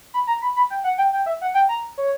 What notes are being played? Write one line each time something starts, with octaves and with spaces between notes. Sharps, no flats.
B5
A#5
B5
B5
G5
F#5
G5
G5
E5
F#5
G5
A#5
C#5